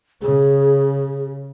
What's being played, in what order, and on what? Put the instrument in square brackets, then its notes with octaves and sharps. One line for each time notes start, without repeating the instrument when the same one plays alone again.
[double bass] C#3 [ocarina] G#4